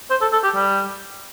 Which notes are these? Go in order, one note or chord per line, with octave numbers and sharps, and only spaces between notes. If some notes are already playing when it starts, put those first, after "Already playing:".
C5
A4
A4
G4
G3